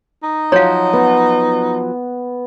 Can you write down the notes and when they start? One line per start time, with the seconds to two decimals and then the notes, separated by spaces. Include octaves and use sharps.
0.23 D#4
0.52 F3 F#3 F#4 C#5 F5
0.93 B3